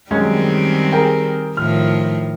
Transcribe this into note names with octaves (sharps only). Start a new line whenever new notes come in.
F#2 D#3 G3 G#3 C4 C#4
G#4 A#4 G5
A2 D#3 F3 F6